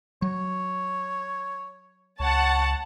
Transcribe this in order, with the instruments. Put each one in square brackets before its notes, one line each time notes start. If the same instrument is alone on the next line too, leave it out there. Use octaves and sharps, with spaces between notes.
[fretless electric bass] F#3 [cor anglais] C#5
[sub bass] C#2 [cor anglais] C#5 [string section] F#5 A5